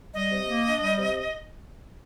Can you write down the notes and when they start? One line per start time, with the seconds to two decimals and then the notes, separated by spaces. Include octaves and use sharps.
0.14 G3 D#5
0.30 C3
0.47 A#3
0.64 D4
0.80 G3
0.97 C3